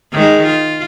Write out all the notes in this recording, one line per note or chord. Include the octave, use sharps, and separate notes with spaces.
D#3 G#3
F4